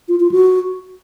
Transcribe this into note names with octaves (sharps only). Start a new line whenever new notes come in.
F4
F4
F#4